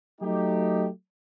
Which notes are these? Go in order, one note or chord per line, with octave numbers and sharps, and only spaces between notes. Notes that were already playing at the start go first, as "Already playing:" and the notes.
F#3 A3 D#4 G4